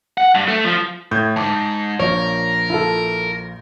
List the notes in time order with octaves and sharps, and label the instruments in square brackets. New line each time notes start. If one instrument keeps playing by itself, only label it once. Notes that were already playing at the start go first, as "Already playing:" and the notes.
[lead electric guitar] F#5
G2
A3
F3
[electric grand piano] A2 [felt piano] G6 G#6
[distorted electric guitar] E2 G#2 [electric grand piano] A5 D6
[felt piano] A#1 F3 [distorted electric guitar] A#4 [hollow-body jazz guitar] C#5
[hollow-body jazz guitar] E4 F4 A4